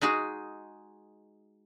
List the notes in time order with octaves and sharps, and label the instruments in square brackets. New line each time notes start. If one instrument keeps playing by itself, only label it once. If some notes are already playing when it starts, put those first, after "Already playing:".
[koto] G#3 D#4 F#4 G#4